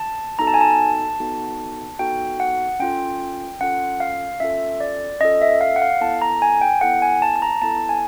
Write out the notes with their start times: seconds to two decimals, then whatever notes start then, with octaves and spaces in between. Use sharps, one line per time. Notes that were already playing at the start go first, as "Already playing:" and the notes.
Already playing: A5
0.39 B3 D#4 F#4 A4 A#5
0.47 A5
0.54 G#5
0.61 A5
1.20 B3 D#4 F#4 A4
1.99 B3 D#4 F#4 A4 G5
2.40 F#5
2.80 C#4 F4 A4 G5
3.61 C#4 F4 A4 F#5
4.00 F5
4.40 C#4 F4 A4 E5
4.80 D5
5.20 C#4 F4 A4 D#5
5.42 E5
5.61 F5
5.76 F#5
5.82 F5
6.01 B3 E4 A4 A5
6.22 A#5
6.42 G#5
6.61 G5
6.81 B3 E4 A4 F#5
7.02 G#5
7.22 A5
7.36 A5
7.42 A#5
7.62 B3 E4 A4 A5
7.89 G#5